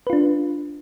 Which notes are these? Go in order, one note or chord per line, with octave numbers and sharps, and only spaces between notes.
D4 F4 B4